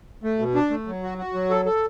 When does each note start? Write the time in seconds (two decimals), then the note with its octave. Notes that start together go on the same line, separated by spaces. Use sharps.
0.23 A3
0.39 B2
0.55 D4
0.70 A3
0.87 F#3
1.03 F#4
1.18 F#4
1.34 F#3
1.50 A4
1.66 A4